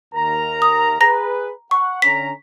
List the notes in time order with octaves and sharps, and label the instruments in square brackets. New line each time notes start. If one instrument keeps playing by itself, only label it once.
[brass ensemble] D#2 A#4 A#5
[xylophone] D#6
[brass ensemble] G#4 B4 [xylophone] A#5 A#6
[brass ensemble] F#5 [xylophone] C#6
[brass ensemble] D3 C#4 A#5 [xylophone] B6